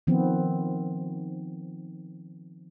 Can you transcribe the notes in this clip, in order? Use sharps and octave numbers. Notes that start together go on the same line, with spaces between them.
D#3 F3 B3 C4